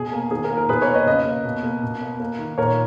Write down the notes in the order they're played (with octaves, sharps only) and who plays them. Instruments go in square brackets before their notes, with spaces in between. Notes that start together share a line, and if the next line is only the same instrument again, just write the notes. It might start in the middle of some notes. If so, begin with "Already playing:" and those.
Already playing: [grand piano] B2 G#4
A#3
D#3 G#4
A#4
A#3
A#4
B2 G#4 B4
A#4 C#5
A#3
B4 D#5
C#3 B4 D#5
A#3
B2
A#3
B2
A#3
A#3
D#3
A#2 A#4 C#5